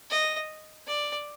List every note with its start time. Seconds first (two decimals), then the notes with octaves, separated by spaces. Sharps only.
0.10 D#5
0.87 D5